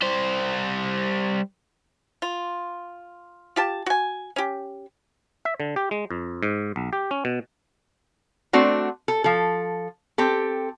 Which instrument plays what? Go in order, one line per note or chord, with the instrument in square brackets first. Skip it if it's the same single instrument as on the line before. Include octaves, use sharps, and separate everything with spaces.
[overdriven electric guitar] G3 C5
[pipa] F4
F4 G4 A5
F#4 G#5
C#4 G4
[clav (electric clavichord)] E5
D3
G4
G#3
F2
G#2
B1
G4
C#4
B2
[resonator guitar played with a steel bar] A3 C4 D4 F#4
A4
F3 A4
C4 G4 A4